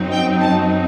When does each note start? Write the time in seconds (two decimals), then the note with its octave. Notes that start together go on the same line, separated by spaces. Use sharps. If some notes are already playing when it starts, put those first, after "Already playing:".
Already playing: F#2 F#3 C4 D#4
0.13 G5
0.41 A5